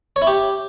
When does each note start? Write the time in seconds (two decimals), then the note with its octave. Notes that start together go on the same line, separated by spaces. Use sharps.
0.16 C#5
0.22 E4
0.27 G4